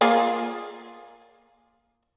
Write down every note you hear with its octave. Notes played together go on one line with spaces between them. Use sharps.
A#3 F4 G#4